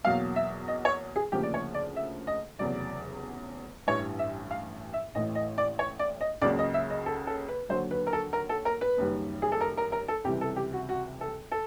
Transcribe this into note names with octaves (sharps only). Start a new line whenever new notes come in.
E2 B2 F#3 A#3 F5
E5
D#5
C#5
G#4
D2 C#3 F3 A#3 G4
D5
C#5
D5
E5
D#5
F1 E2 C#3 F#3 D5
A1 G2 E3 C#5
E5
F5
E5
A1 A2 E3 D#5
D#5
D5
C#5
D5
D#5
C#2 C#3 F#3 A#3 D5
D#5
E5
D#5
A4
A4
B4
D#2 D3 F#3 C5
B4
A#4
A4
A#4
A4
A#4
B4
F#1 F#2 D#3 G3
G#4
A4
A#4
A#4
A#4
A4
C#2 C3 E3 G3 G4
A4
G4
F#4
F#4
A4
A4